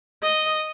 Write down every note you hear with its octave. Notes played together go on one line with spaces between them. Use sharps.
D#5